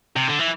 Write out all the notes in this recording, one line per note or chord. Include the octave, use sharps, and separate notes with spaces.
C3
D3
E3